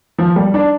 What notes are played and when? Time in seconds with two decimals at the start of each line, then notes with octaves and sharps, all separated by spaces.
0.18 F3
0.36 G3
0.54 D4